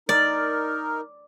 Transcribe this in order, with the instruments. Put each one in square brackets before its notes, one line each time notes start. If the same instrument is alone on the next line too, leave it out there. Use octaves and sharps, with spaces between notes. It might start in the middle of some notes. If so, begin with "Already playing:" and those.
[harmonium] D#4 A#4 [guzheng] D5